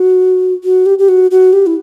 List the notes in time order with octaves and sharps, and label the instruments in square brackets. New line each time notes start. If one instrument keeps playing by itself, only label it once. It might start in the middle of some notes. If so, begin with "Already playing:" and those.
Already playing: [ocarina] F#4
F#4
G4
G4
F#4
F#4
G4
E4